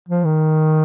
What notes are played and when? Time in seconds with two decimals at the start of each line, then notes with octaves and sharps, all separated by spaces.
0.08 F3
0.25 D#3